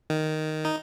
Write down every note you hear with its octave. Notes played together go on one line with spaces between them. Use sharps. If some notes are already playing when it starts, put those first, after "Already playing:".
D#3
D#4